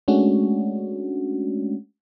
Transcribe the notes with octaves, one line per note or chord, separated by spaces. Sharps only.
G#3 A3 C#4 D4 F#4